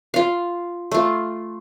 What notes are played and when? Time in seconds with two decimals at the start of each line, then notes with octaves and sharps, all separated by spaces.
0.14 F4 F5
0.92 A3 F4